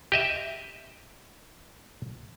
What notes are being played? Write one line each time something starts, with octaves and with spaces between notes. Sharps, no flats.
G4 D#5 E5